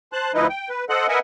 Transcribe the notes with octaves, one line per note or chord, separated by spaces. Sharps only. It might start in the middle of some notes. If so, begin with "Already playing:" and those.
C5 A5 F#6
D2 F3 D#4 E4 B4 D#5
G5
B4
A4 C5 D#5 F#5 F#6
A#4 B4 D#5 E5 F#5 G#5